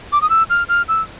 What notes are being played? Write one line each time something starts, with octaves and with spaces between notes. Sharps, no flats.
D6
D#6
E6
F6
F6
E6